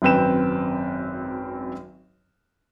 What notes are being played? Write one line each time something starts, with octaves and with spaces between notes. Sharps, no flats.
G#1 F#2 C4 B4 G5 E7